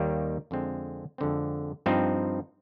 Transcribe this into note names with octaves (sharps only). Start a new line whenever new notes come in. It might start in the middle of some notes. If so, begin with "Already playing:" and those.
Already playing: D#2 D#3 G3 A#3
F2 D3 G#3 C4
F2 D3 G#3 C4
G2 F3 C4 D#4